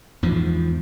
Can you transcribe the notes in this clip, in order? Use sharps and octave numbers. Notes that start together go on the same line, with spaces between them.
E2 G#2 F3